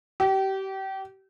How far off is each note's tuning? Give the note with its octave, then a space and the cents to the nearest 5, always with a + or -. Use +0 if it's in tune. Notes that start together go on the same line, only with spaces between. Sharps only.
G4 -30